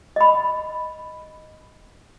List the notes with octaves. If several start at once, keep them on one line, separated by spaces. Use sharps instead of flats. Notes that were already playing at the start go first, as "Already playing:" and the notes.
D#5 B5